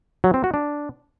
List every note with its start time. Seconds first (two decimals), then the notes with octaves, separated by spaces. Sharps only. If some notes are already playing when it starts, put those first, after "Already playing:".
0.24 F#3
0.34 C4
0.44 F#4
0.54 D4